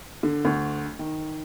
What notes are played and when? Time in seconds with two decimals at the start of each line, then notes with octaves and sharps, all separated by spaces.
0.23 D3
0.45 D2
0.99 D#3